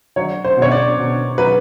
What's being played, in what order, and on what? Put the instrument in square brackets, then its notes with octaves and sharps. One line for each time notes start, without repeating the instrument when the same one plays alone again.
[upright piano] F#3 C#5
C5
B2
C#5
D5
B2
F#3 B4